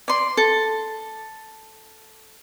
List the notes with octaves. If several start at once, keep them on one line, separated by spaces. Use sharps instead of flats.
D5 C6
A4